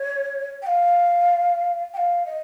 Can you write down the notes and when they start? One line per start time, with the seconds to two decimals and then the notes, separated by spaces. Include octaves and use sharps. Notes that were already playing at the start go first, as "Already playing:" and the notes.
Already playing: C#5
0.62 G5
0.66 F5
1.94 G5
1.97 F5
2.26 D#5